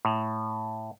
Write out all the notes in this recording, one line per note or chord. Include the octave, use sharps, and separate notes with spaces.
A2